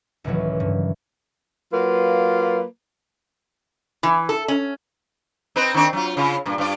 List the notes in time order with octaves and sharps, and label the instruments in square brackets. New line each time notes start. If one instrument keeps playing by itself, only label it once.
[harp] C#2 A2 D#3 E3 F#3
G2
[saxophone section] F#3 A#3 F4 B4
[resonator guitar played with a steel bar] E3
A4
C#4
[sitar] C4 D#4 B4
D#3 C4 D4
F#3 F4
C#3 F4
G2 A#2
G2 F4 D5